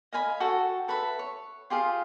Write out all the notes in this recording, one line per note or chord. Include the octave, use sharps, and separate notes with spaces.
D#5 F5 G#5 B5
F#4 A4 G5
A4 B4 E5 B5
C#5
F4 G4 G#4 F5